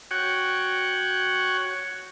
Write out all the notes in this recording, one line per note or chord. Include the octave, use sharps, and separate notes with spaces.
F#4 C#5 F#5 G5